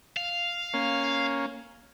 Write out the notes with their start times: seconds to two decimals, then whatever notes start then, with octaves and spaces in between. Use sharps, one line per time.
0.17 F5
0.74 A#3 C#4